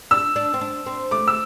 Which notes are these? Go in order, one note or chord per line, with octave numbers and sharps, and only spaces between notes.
D4 E6
D4
C4
D4
C4
A3 D6
E6